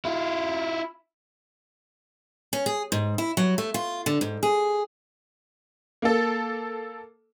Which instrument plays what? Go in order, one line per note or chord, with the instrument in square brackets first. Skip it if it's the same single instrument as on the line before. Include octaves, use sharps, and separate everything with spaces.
[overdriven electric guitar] E4 F4
[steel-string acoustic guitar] C#4
G#4
G#2
E4
F#3
A3
F4
D3
G#2
G#4
[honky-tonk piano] A#3 A4